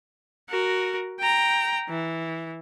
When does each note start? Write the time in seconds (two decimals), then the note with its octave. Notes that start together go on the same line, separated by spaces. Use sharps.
0.49 F#4 A#4
1.19 G5 A#5
1.89 E3